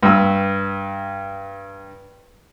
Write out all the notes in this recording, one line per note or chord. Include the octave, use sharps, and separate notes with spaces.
G2 E6